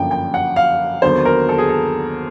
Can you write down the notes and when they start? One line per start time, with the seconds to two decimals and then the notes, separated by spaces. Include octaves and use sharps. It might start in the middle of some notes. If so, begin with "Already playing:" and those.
Already playing: G1 F#2 D3 F3 A#3 G5
0.11 G5
0.34 F#5
0.56 F5
1.02 D#2 D3 F#3 B3 C5
1.25 A#4
1.49 A4
1.58 G#4
1.69 A4